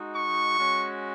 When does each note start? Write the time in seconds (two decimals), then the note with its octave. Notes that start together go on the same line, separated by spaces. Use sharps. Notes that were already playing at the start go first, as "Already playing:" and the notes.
Already playing: G#3 D#4 F#4
0.12 C#6
0.58 G#3 C#4 F#4